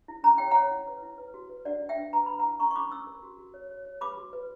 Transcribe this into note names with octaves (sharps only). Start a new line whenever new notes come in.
E4
C#4 A#5
C#5 G5
C#5 F#5 A#5
E4
B4
E4
B4
F#4
B4
D4 D5 F#5
D4
E5 G5
D4
B4 A#5
B4 B5
F#5 A#5
E4
C#4 A#5 C#6
C#6
C#4 B5 D6
C#4 C#6 E6
A#4
F#4
F#4
C#5
C#5
C#5
B4 B5 D6
F#4
B4